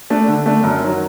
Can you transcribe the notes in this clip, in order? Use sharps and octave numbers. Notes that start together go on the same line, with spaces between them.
A3 D4
D3
A3 D4
F#2
D#3 F#3